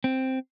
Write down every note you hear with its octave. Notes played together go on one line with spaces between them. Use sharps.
C4